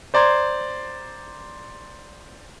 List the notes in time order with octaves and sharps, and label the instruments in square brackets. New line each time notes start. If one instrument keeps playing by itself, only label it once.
[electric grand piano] C5 D5 A#5 C6 G#6